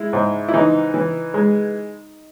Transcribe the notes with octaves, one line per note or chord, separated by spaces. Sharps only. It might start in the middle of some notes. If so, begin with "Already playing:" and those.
Already playing: G#3 E4
G#2
E4
E3 D#4
E3
G#3